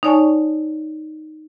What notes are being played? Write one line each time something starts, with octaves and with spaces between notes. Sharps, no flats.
D#4 C#5 D5 G#5 A5 C#6